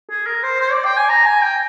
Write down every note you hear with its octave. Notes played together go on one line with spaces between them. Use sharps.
G#4
A#4
C5
C5
D5
G5
G#5
A#5
G#5
G5